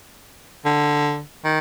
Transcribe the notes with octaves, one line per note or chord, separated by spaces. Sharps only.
D3
D#3